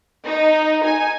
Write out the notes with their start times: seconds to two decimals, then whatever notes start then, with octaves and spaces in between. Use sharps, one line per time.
0.24 D#4
0.84 G#5